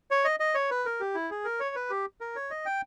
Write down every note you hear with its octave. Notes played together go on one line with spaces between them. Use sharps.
C#5
D#5
D#5
C#5
B4
A#4
G4
E4
G#4
A#4
C#5
B4
G4
A#4
C#5
D#5
G5